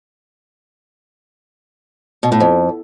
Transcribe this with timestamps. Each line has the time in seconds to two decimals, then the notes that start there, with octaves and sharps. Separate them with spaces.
2.23 B2
2.32 A2
2.40 F2